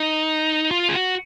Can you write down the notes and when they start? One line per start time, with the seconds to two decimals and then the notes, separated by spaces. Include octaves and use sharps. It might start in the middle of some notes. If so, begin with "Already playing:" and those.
Already playing: D#4
0.71 F4
0.89 G#4
0.95 F#4